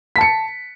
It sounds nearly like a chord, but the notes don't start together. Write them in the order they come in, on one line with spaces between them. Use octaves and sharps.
B6 A5 C#7